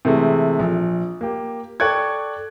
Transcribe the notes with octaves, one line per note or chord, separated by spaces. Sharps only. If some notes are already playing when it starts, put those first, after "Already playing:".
C3 E3 G#3 A3 G#4
A#1
A#3 G4
A4 D5 G5 C#6 F#6 G#6